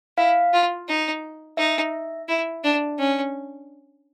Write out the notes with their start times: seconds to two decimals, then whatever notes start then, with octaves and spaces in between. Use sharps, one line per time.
0.18 E4 F5
0.53 F4
0.88 D#4
1.57 D#4 E5
2.28 E4
2.64 D4
2.99 C#4